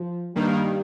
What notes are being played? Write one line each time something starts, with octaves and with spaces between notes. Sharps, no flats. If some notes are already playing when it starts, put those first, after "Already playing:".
Already playing: F3
G2 D#3 G3 A#3